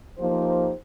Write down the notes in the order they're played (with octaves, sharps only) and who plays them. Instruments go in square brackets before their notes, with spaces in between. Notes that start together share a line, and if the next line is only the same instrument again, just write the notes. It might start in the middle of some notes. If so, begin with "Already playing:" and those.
[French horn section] F3 A#3 D#4 G4 C5